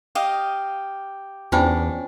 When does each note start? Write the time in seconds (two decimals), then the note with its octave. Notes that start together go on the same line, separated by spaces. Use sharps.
0.15 G4 D#5 F5
1.52 E2 C#4 D4 F4 C5 G5